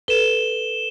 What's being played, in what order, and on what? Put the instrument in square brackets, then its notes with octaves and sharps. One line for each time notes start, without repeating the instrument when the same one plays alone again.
[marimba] A4 B4 [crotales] E7 G7